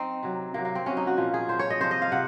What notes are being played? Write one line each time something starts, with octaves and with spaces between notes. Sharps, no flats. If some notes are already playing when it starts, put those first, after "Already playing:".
Already playing: C4 D#4
C3 F#3
C3 F#3 A#3
A#3
C4
C3 F#3 C#4
D#4
F#4
A#2 F3 F4
G#4
A#2 F3 C5
C#5
D#5
C3 F3 C5
D#5
F5
C3 F#5